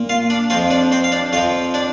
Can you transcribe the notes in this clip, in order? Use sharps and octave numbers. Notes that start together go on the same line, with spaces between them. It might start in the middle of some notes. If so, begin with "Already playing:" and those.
Already playing: A#2 A#3
F4 F5
D4 D5
F2 F3 C4 F4 F5
D4 D5
C4 C5
F5
D4 D5
F2 F3 C4 F4 F5
D4 D5